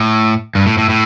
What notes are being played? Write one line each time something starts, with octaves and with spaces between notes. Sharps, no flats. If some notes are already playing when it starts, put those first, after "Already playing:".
Already playing: A2
G2
A2
A2
A2